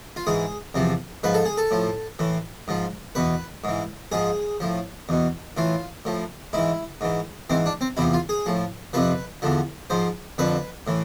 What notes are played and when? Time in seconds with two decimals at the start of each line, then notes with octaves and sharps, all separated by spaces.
0.16 F4
0.27 G#2 E3 G#4
0.74 E2 C3 F3
1.23 G#2 F3 B4
1.34 A4
1.45 G#4
1.57 A4
1.71 A2 F3
2.19 A2 E3
2.68 G#2 F3
3.15 E2 B2 B4
3.64 G#2 E3
4.12 G#2 F3 G#4
4.60 A2 F3
5.09 E2 B2
5.57 A2 E3 F4
6.05 A2 F3
6.53 G#2 E3 E4
7.01 G#2 E3
7.50 G#2 E3 C4
7.66 D4
7.81 C4
7.97 E2 C3 F3 E4
8.13 F4
8.29 G#4
8.46 A2 F3
8.93 F2 C3 F3 B4
9.42 E2 D3 F3
9.90 G#2 F3 C5
10.38 F2 D3 F3 B4
10.87 A2 E3